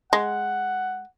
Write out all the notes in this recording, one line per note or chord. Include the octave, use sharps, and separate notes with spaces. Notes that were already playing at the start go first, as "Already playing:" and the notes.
G#3 F#5